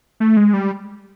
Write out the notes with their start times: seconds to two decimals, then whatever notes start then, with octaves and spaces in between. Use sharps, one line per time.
0.20 A3
0.37 G#3
0.53 G3